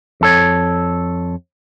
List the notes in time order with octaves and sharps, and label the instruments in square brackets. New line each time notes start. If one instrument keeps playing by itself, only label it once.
[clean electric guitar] F2 A4 C#5